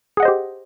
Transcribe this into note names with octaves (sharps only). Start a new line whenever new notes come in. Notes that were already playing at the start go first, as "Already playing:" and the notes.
G4 G#4 C5 D#5 F#5